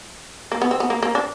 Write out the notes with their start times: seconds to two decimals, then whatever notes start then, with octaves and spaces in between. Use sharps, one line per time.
0.52 A#3
0.62 B3
0.71 C4
0.80 B3
0.90 A#3
1.03 A#3
1.15 D4